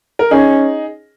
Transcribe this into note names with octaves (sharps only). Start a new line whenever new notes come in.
A#4
C#4 D#4 G#4